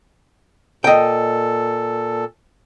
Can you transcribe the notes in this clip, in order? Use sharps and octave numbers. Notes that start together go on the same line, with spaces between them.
A#2 A4 D#5 G5